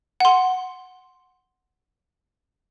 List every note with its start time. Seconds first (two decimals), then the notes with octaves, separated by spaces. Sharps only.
0.20 F#5 C6